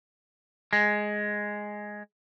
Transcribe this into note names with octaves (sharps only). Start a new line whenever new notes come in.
G#3